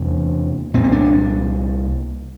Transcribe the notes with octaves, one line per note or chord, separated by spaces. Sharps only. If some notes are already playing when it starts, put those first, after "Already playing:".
Already playing: E2 C3 A#3
C2 A#2 C4
C4
D4